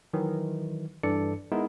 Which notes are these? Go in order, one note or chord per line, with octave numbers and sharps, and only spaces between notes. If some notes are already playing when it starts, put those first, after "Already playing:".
D#3 E3 F#3
G2 E3 D4 A4 D5 C#7
G#3 B3 D#4 E4 A#4